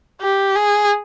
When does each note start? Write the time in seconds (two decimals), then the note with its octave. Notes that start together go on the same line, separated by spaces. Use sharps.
0.21 G4
0.55 G#4